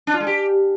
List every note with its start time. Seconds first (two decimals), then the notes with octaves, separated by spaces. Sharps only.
0.07 D4
0.14 F4
0.20 G#3
0.27 G4